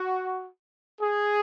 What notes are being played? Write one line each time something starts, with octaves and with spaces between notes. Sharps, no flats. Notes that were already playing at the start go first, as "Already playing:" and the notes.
Already playing: F#4
G#4